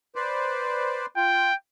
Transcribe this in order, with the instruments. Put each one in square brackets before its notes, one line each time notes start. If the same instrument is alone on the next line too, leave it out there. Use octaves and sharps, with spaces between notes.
[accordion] B4 C5 D5
[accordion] F4 [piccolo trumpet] G5